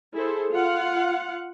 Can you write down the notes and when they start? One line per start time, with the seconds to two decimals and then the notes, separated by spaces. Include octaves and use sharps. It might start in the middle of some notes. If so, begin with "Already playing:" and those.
0.14 E4 G#4 A4 C5
0.51 F4 F5 F#5